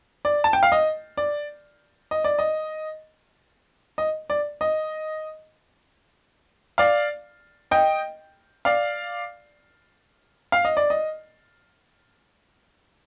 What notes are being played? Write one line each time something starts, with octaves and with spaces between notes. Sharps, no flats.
D5
A5
G5
F5
D#5
D5
D#5
D5
D#5
D#5
D5
D#5
D5 F5
D#5 G5
D5 F5
F5
D#5
D5
D#5